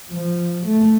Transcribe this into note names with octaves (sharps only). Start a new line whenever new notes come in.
F3
A3